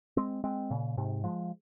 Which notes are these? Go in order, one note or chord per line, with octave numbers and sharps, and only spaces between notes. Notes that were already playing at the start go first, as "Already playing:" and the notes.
G#3 C4
G#3 C4
A#2 C#3
G#2 C3
F3 G#3